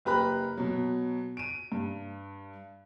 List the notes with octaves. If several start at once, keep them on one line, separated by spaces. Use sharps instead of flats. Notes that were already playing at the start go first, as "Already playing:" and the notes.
F#1 G4 B4 A#5 B5 F#6
B2 F#3
D7 D#7
G2